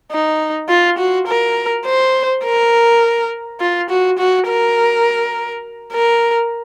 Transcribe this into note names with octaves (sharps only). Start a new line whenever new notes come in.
D#4
F4
F#4
A#4
C5
A#4
F4
F#4
F#4
A#4
A#4